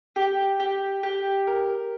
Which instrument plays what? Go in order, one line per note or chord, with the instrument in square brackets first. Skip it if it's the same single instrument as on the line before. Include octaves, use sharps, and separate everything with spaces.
[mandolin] G4
G4
G4
A#4